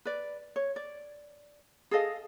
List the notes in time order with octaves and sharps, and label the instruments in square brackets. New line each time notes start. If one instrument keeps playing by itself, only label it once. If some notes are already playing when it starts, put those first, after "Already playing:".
[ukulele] B4 D5
C#5
D5
G#4 A4 D#5 F5